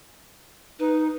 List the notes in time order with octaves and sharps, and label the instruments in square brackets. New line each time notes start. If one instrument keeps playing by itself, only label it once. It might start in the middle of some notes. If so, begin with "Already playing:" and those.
[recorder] D#4 [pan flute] B4